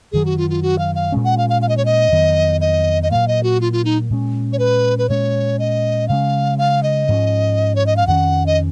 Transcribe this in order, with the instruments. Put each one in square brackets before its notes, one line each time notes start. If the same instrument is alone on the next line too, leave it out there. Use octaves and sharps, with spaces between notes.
[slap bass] F#2 D#3 F#3 [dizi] G#4
[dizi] F#4
F4
F4
F#4
F5
F5
[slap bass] A#2 G#3 C#4
[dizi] F#5
F5
F5
F5
D#5
C#5
D#5
[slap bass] F2 D#3 F#3 B3
[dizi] D#5
D#5
[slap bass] A#2 F#3 A#3 [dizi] F5
[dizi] D#5
F#4
F4
F4
D#4
[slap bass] A#2 G#3 C#4
[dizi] C#5
B4
B4
[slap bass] A#2 G#3 C#4 [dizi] C#5
[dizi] D#5
[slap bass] C#3 G#3 C#4 [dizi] F5
[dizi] F5
D#5
[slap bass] G#2 F3 A#3 C#4
[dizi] C#5
D#5
F5
[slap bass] F2 D#3 A#3 C#4 [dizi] F#5
[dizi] D#5